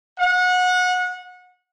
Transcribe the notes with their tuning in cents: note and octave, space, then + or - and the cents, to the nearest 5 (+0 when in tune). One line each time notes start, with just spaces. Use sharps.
F#5 -25